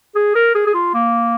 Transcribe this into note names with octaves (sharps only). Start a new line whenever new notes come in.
G#4
A#4
G#4
G#4
F4
A#3